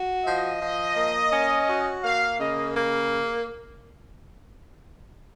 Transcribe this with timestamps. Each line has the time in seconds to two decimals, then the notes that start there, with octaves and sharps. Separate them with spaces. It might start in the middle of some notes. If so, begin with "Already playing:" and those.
Already playing: F#4
0.25 F3 D#5
0.61 F3
0.96 A#3
1.32 C#4
1.68 F#4
2.04 A#3 F5
2.40 C#3 D#5
2.76 A#3